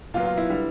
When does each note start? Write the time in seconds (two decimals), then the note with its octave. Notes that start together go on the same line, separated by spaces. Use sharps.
0.14 A#2 F#3 B3 F4
0.25 F4
0.38 E4
0.49 D3 G3 B3